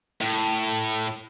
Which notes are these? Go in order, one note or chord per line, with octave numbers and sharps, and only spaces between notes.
A2